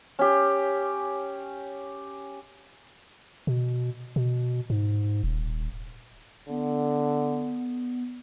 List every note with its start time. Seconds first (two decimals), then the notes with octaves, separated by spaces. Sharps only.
0.19 C#4 G4
3.47 B2
4.16 B2
4.70 G#2
5.24 D#1
6.49 D3 B3